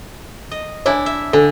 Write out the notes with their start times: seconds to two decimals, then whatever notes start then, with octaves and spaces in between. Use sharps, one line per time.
0.51 D#5
0.86 D4 E4 C#5 G#5
1.06 E5
1.33 D3 A4 G#5